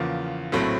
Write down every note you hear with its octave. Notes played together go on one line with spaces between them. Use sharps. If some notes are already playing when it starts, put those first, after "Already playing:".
Already playing: E2 C#3 F3 A#3
A#1 A2 F#3 A3 C4